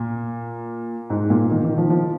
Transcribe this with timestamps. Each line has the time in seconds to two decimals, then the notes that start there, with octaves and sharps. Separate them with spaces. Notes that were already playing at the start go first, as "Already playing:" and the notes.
Already playing: A#2
1.10 G#2
1.30 A#2
1.51 D#3
1.64 D#3
1.77 F3
1.90 F3